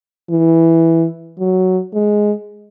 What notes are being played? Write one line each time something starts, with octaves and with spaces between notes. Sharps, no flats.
E3
F#3
G#3